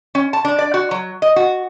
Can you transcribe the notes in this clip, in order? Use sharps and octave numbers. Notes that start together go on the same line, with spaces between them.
C#4
A5
D4
D5
F#4
F#3
D#5
F#4